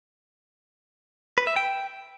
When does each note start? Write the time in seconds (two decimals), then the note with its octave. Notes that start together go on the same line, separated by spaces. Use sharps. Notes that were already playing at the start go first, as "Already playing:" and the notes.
1.38 B4
1.47 E5
1.56 G5